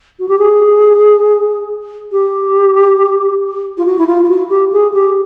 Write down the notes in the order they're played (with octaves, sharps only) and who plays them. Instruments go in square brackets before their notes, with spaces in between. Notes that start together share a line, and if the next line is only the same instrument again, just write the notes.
[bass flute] F#4
G4
G#4
G4
F4
F#4
E4
F4
F4
F#4
G4
G#4
G4